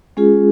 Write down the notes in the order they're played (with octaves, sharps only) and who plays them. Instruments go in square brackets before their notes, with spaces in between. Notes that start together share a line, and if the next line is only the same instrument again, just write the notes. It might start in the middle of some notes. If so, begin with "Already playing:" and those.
[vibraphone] G#3 C#4 F4 G#4